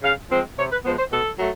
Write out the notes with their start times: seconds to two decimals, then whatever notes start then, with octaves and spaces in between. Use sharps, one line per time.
0.02 C#3 F5
0.30 F3 G#3 C4 C5
0.58 C3 C#5
0.71 B4
0.84 F3 G#3 B3 C5
0.98 C5
1.11 B2 A4
1.39 F#3 A3